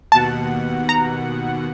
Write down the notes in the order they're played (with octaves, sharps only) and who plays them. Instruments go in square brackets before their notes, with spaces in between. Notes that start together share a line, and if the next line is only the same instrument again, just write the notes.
[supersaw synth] D#2 B2 F#5 [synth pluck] A5
[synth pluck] A#5